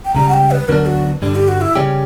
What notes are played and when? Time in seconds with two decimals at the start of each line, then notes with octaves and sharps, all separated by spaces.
0.05 G5
0.14 C#2 C#3 G3 A#5
0.29 F#5
0.33 G5
0.51 B4
0.68 D2 D3 F#3 B3 D4 A#4
0.86 F#4
1.22 G2 D3 G3 D4
1.36 G4
1.48 F#4
1.61 E4
1.76 C#3 G3 C#4 G4